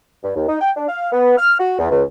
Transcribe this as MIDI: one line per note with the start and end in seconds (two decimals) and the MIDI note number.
0.24 0.32 43
0.36 0.47 39
0.48 0.56 63
0.61 0.71 79
0.76 0.88 62
0.89 1.09 77
1.13 1.36 59
1.38 1.55 89
1.59 1.76 66
1.79 1.91 40
1.91 2.03 37